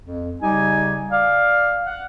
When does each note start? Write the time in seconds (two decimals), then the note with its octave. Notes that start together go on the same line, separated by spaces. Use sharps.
0.06 F2
0.42 C#3 G3 D#4 G4 G#5
1.12 D5 F5
1.87 F5 F#5